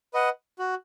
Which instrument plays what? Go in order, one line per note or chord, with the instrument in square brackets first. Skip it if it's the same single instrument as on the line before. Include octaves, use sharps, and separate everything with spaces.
[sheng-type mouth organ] B4 D#5 F#5
F#4